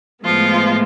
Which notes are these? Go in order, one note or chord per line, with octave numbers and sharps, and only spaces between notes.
A2 F3 G#3 B3 F4